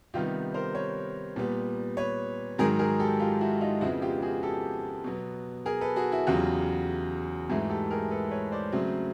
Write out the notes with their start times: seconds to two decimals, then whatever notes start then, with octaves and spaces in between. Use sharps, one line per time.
0.14 C3 D#3 G3 B3 F4 G4
0.54 A#4 C5
0.75 B4 C#5
1.36 A#2 G3 B3
1.97 B4 C#5
2.58 G#2 D#3 F#3 G#4 A#4
2.79 G#4 A#4
2.99 G4 A4
3.20 F4 G4
3.40 E4 F#4
3.61 D#4 F4
3.81 F2 C#3 F3 G#3 B3 E4 F#4
4.01 F4 G4
4.22 F#4 G#4
4.43 G4 A4
5.04 B2 F#3 B3
5.66 G#4 A#4
5.81 A4 B4
5.96 F#4 G#4
6.12 E4 F#4
6.27 E2 C#3 F#3 F4 G4
7.50 G#2 E3 A3 F#4 G#4
7.70 G4 A4
7.90 G#4 A#4
8.11 A4 B4
8.31 B4 C#5
8.52 C5 D5
8.72 C#3 F#3 A3 C4